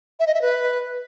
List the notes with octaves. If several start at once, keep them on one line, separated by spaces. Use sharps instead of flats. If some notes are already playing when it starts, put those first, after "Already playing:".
E5
D#5
E5
B4